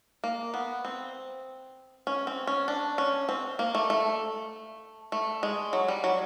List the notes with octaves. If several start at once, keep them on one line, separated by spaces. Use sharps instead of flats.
A#3
B3
C4
C#4
C4
C#4
D4
C#4
C4
A#3
A3
A3
A3
G#3
F#3
G3
F#3